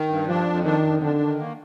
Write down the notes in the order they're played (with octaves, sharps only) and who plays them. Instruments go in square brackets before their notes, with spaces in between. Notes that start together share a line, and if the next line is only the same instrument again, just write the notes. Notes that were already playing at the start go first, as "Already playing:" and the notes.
Already playing: [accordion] D#3
G2
[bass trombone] F3 [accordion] D4
[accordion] F2
[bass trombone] D#3 [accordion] D4
[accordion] F2
[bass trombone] D3 [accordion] D4
[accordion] D#3
A#3